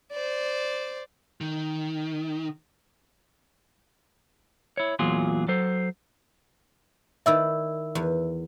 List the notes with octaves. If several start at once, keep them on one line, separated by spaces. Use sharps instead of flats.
C5 D5
D#3
E4 C#5
E2 A#2 F#3 F4 G#4 C6
F#3 A4 C5
D#3 E4 D5 E5 E6
E2